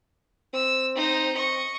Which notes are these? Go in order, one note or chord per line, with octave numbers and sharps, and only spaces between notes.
C4 E6
D#4 C5
D#5 C#6